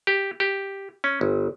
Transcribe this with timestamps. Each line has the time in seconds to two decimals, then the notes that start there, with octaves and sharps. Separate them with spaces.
0.07 G4
0.40 G4
1.04 C#4
1.21 G1